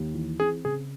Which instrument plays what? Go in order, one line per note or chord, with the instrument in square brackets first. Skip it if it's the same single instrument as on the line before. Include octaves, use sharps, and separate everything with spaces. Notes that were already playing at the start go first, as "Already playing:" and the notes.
Already playing: [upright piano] D#2
E3
[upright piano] C4 [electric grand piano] G#4
[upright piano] C#3 [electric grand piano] G#4